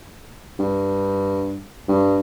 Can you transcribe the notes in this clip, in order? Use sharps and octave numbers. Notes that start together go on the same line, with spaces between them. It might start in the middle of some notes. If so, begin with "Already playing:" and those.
G2
G2